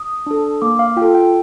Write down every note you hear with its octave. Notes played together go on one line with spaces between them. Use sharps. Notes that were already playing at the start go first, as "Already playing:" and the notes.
Already playing: D#6
D4 A4
A#3 D6
F5
F4 A4 G5
G5